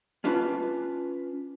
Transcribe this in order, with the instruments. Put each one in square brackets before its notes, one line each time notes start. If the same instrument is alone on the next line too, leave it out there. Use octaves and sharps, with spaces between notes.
[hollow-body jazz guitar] C#4 D4 F4 B4